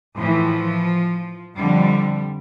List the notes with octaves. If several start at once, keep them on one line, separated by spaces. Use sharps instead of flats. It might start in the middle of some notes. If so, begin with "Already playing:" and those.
A2 E3 F3
F2 D3 F3 G3